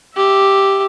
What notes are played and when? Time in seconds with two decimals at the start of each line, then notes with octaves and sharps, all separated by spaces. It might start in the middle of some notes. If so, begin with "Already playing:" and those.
0.15 G4 E5